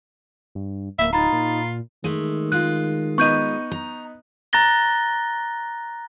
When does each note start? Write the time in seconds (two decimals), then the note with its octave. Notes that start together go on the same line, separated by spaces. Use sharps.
0.55 G2
0.99 D1 A#3 E5
1.13 D#4 F4 A#5 B5 A6
1.32 A#2
2.04 D#3 G#3 A3
2.52 G#3 F4 F#6
3.18 B3 D#4 C#6 G6 D#7
3.71 A#5
4.53 A#5 F#6 A6 A#6 G7